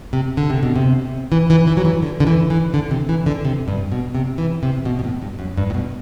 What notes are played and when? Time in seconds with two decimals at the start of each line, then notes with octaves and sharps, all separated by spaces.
0.13 C3
0.37 D3
0.50 C3
0.63 B2
0.76 C3
1.32 E3
1.50 E3
1.67 E3
1.77 F#3
1.85 E3
2.02 D3
2.20 D3
2.27 E3
2.50 E3
2.74 D3
2.91 C3
3.09 E3
3.26 D3
3.45 C3
3.68 G2
3.92 B2
4.15 C3
4.38 E3
4.63 C3
4.85 B2
4.99 B2
5.04 A2
5.22 G2
5.39 F#2
5.57 G2
5.70 A2
5.74 B2